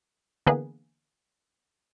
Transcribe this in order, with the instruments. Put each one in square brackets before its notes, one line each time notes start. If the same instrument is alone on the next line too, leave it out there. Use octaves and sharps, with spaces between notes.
[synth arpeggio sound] D3 E3 A#3 B3 G#4 B4